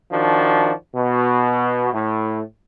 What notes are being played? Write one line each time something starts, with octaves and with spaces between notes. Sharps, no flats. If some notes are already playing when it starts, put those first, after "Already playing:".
D#3 F3 D4 F#4
B2
A2